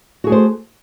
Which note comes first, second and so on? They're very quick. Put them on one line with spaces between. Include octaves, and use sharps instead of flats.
F#4 G#4 A3 C5